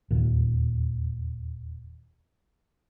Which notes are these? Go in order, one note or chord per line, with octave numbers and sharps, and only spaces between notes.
E1 D#2 A#2 D#3